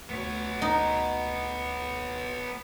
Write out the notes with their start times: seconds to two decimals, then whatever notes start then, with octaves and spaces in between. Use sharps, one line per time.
0.09 D2 B3 C#5
0.62 D#4